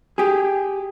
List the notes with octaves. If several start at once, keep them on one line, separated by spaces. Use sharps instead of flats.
G4 G#4